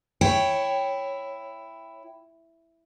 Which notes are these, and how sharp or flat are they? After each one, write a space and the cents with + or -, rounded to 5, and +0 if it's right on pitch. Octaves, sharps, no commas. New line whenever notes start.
E4 +5 C#5 +0 G5 +0